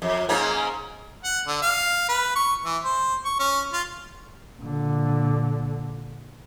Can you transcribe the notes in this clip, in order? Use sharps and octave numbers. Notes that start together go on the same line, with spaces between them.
F2
G#2 A#3 C#4
F#5
D3
F5
B4
C#6
E3
C5
C#6
C#4
F4
A#2 D3